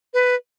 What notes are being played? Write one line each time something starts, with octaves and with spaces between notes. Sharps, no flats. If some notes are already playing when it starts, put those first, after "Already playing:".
B4